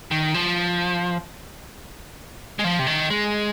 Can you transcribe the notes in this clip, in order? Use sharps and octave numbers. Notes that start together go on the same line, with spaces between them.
D#3
F3
G#3
F3
C3
D#3
G#3